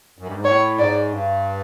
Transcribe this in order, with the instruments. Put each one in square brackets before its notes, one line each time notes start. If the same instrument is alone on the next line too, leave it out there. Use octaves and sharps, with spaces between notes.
[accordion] F#2
G2
G#2
[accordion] A2 [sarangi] C#5
[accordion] G#2 [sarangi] D5
[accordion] G2